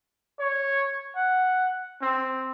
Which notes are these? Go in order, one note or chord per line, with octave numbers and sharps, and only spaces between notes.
C#5
F#5
C4